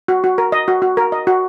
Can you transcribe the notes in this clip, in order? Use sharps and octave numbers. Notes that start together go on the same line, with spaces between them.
F#4
F#4
A#4
D#5
F#4
F#4
A#4
D#5
F#4